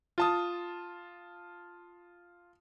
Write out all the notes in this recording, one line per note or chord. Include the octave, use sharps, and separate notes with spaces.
F4 A5 D#6